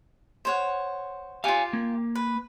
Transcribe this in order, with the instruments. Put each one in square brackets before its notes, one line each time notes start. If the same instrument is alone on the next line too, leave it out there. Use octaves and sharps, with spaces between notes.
[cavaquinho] C5 C#5 F#5
[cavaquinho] F4 G4 [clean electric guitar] F5 G#5
[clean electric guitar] A#3
[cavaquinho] B4